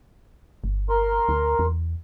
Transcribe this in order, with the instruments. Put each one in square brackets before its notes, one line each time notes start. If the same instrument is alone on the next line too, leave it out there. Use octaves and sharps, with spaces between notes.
[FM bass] G1
[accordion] A#4 C6
[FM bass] D2
E2